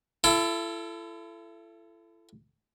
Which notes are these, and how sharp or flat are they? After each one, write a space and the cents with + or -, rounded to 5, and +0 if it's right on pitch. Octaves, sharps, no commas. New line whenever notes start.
E4 +40 A4 +0